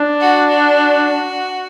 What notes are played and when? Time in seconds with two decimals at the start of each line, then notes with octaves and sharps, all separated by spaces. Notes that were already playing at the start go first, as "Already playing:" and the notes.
Already playing: D4
0.20 F#4
0.49 F#4